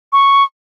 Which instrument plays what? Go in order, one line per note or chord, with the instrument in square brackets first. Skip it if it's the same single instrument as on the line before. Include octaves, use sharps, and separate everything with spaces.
[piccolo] C#6